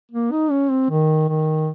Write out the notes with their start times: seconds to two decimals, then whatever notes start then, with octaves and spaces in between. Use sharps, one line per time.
0.12 A#3
0.32 D#4
0.51 C#4
0.70 C4
0.90 D#3
1.28 D#3